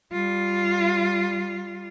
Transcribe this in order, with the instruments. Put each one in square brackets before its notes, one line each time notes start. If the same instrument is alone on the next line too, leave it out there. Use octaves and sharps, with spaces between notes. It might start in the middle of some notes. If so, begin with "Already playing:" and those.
[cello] G3 F4